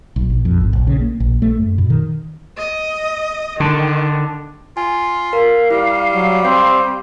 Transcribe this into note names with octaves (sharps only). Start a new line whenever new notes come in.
B1
A#1
F2
G#1
A#1
C#3
A#3
A#1
A3
F#2
B2
D#3
D#5
D3 D#3
F4 G#5
A#4 F5
G3 E4
F#3
C4 C5 G6